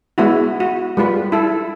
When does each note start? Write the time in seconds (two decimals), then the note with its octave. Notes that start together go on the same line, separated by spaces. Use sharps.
0.18 G#3 B3 E4 F#4
0.60 F#4
0.97 G3 G#3 F4 B4
1.32 E4 A4